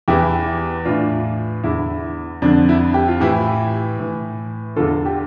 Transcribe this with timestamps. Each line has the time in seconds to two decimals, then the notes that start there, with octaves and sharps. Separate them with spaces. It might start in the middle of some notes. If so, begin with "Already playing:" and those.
0.08 E2 E3 E4 G4
0.85 A2 E3 D4 F4
1.63 E2 D3 E4
2.42 F2 D3 D4
2.69 E4
2.94 G4
3.08 F4
3.20 A2 E3 E4 G4
3.99 A2 E3
4.76 E2 D3 F4 A4
5.06 G4